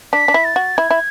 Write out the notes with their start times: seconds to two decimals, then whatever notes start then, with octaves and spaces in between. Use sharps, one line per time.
0.13 D4 B6
0.28 D4
0.34 E4
0.45 A6
0.56 F#4
0.77 E4 G#6
0.91 E4